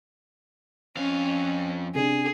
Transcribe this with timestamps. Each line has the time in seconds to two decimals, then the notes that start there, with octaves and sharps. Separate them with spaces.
0.97 F2 C#4 F5
1.95 C3 D4 G#4